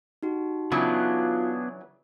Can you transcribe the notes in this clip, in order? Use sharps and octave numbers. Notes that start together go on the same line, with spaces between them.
D#4 F#4 G4
C#3 E3 F#3 B3 D4 F4 G#4